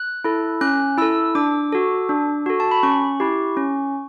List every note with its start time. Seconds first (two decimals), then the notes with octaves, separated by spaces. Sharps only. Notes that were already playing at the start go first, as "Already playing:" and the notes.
Already playing: F#6
0.24 E4 A4
0.61 C#4 F#6
0.98 E4 A4 E6
1.35 D4 D6
1.72 F#4 A4
2.09 D4
2.46 F#4 A4
2.60 A5
2.71 B5
2.83 C#4 C#6
3.20 E4 G4
3.57 C#4